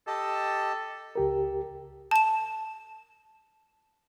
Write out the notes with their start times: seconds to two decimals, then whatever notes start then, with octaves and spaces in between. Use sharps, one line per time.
0.07 G4 A4 D#5 A5
1.16 C#2 G4 A#4
2.11 A5 E7